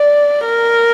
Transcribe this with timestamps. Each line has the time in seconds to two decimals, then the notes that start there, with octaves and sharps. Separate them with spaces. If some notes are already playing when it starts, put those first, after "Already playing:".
Already playing: D5
0.46 A#4